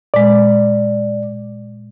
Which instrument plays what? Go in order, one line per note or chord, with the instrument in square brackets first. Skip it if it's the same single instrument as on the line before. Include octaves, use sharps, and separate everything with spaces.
[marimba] A#2 G#3 [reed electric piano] D5